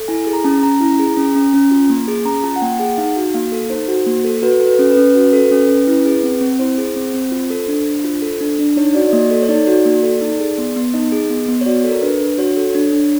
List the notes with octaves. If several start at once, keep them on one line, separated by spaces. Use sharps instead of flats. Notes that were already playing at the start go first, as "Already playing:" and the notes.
Already playing: A4
E4 G#5
G#4
A#5
C#4 A5
C#4 A#5
E4
G#4
C#4
C#4
C#4
F4
A#3
G#4
C#4 A#5
F4 A5
F#5
A#3 G5
G#4 F#5
D#4 F5
F#4
A#3 F5
A4
D#4 C5
F#4
A#3
A4
F#4 B4
A4
B4
C#4
B4
C#4
F#4
A4
C#4
C#4
E4
G#4
C4
C4
E4 C5
G#4
C4
C4
F4
A4
D4
D4
F4
A4
D4
D4
D#4 C#5
F#4 D5
D5
A#3 D#5
A4
C#5
D#4 D5
F#4
A#3
A4
D#4
G#4
B3
B3
D#4 D#5
G#4
B3
B3
C#5
F#4 D5
A4
A#4
D4 B4
D4
F#4 C#5
A4
D4
D4